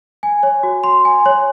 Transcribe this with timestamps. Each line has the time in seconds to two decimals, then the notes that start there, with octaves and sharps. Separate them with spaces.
0.23 G#5
0.43 C#5
0.63 F#4
0.84 C6
1.05 G#5
1.26 C#5